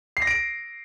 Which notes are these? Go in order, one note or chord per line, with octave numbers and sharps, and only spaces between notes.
C7
A#6
D7